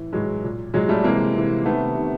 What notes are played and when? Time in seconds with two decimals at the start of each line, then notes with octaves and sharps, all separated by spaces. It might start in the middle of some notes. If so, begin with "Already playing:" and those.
Already playing: A2 E3
0.13 A2 E3 F#3 G#3
0.44 A#2
0.74 A#2 F#3 G#3
0.89 G3 A3
1.04 C3 E3 G#3 A#3
1.34 C3 E3
1.65 C3 D#3 A3 B3
1.95 C3 D#3